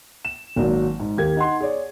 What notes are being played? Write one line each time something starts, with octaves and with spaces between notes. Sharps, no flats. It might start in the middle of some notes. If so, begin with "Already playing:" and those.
E7
G#1 F#3 A#3 D5
G#2
D#2 G4 A#4 G#6
D#4 F#5 C6
G#4 C#5 D5